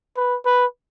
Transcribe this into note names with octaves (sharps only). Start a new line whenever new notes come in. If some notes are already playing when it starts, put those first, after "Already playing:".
B4
B4